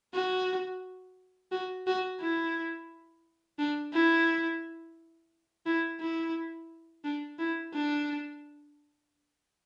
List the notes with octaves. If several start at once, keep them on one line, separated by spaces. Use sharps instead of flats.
F#4
F#4
F#4
E4
D4
E4
E4
E4
D4
E4
D4